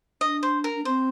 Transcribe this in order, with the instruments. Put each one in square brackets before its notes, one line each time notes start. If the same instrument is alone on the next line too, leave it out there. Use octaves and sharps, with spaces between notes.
[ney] D4 [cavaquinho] D#5
[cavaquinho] C5
A#4
[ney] D4
[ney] C4 [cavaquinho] C5